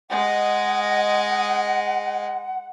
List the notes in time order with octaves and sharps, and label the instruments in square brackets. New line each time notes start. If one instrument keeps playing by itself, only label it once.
[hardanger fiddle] G#3 D#5 [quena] F#5